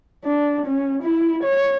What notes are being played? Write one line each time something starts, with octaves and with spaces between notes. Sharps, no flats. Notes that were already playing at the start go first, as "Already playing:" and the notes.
D4
C#4
E4
C#5